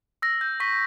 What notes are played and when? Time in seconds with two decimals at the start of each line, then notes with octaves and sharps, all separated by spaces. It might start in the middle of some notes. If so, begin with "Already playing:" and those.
0.22 E6 A#6
0.41 G6
0.60 C#6 B6